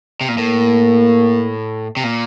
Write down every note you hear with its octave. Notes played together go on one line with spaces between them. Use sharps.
C3
A#2
A2 A#3
C3
A#2